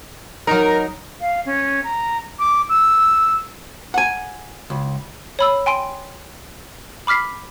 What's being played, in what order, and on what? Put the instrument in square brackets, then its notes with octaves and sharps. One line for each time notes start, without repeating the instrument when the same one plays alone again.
[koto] F#3 D#4 [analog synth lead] A#4
[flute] F5
C#4
A#5
D6
E6
[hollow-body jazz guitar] F#5 G#5
C#2
[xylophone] C#5 B5 E6
G5 G#5 C6 D7
B5 D6 F6 B6 C7